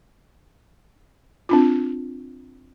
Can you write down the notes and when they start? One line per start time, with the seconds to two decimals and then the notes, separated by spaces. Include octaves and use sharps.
1.49 C4 D4 F4